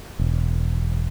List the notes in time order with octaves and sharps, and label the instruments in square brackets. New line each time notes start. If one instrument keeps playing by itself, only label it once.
[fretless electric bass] E1